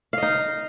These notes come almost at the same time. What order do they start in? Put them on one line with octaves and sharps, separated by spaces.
F5 D#5 D#4